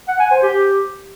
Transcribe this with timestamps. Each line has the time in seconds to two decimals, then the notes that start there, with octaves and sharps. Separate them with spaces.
0.08 F#5
0.20 G#5
0.31 C5
0.43 G4